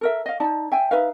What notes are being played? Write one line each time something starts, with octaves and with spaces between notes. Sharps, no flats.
A4 A#4 E5
D#5 F5
D#4 D5 A5
E5 G5 G#5
D#4 B4 E5 F5